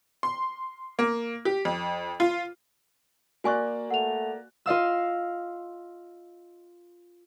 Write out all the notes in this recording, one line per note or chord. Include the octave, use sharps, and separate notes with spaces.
C6
A#3
G4
F2
F4
A#3 F#4 D5 G#5 C#6 F#6
A3 F#5 F7
F4 D#5 F5 E6